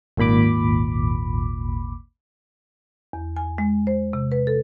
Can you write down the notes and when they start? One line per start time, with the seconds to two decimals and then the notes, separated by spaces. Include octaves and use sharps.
0.17 G#1 D#2 A#2 B5 D6
3.13 E2
3.36 G#5
3.58 G#3
3.87 C5
4.13 C3
4.32 B4
4.47 A4